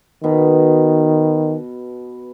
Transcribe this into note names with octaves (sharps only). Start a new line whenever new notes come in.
B2 D#3